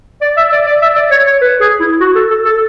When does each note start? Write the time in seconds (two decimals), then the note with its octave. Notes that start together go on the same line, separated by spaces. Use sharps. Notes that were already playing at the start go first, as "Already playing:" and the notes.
0.22 D5
0.37 E5
0.52 D5
0.66 D5
0.82 E5
0.96 D5
1.11 C#5
1.26 C#5
1.41 B4
1.61 G#4
1.80 E4
2.01 F#4
2.15 A4
2.30 A4
2.45 A4